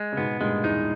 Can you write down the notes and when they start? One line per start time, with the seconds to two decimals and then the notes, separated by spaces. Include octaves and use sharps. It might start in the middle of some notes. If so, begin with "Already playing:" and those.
Already playing: G#3
0.12 C#3
0.17 G#2 B2 B3
0.40 G2 A#2 G#3
0.64 E2 G#2 D#4